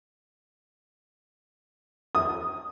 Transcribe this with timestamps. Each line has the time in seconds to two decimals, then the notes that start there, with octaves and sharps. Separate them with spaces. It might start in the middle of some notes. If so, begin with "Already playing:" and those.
2.15 D#6